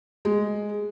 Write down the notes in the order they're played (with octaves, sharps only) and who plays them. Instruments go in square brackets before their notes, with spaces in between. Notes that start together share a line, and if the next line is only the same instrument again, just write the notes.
[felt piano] G#3